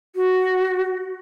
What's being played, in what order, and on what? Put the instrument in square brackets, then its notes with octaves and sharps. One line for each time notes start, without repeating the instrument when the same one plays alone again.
[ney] F#4